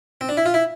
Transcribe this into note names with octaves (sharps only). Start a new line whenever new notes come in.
C4
D4
E4
F4
E4